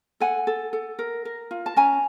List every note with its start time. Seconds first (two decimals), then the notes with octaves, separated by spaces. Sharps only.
0.20 A4 F#5 G#5
0.47 A4
0.73 A4
0.99 A#4
1.25 A#4
1.51 F4
1.66 A5
1.76 C#4 G#5 A#5